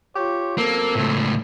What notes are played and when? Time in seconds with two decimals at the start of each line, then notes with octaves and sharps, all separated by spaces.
0.15 F4 G4 C#5
0.58 F#2 A#3 C4 A4
0.95 C#2 A2